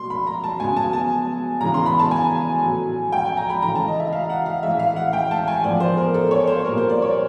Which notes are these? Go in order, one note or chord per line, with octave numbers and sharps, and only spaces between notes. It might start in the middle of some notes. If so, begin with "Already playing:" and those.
Already playing: B2 F#3 A#3 C6
B5
A#5
A5
C#3 F#3 B3 G#5
A5
A5
C#3 E3 G#3 B3 A#5
C6
B5
A5
G#5
A2 F#3 A3
G5
G#5
A#5
B5
C#3 E3 A3 A#5
A5
D#5
E5
F5
F#5
F5
A2 E3 G#3 E5
F5
F#5
G5
A5
G#5
A2 F3 G#3 B3 D5
C5
A#4
A4
C#5
C5
A#2 G3 A#3 A#4
C5
D5
C#5